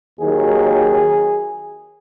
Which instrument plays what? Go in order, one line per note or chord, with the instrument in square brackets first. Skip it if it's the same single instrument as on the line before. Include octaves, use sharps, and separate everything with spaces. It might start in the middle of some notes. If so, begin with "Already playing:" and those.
[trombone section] D#2 D#3 F#3 G#4